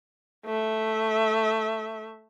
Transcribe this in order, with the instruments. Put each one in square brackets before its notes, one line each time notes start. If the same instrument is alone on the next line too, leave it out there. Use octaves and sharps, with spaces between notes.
[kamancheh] A3 E5